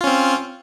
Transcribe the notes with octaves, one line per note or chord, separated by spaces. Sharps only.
C4 C#4 F4